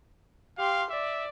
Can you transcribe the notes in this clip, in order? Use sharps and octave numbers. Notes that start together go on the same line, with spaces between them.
G4 F5 C6
D5 E5